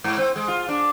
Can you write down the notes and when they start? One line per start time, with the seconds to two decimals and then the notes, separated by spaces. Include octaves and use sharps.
0.04 G#2
0.18 C4
0.36 G#3
0.48 F4
0.69 D4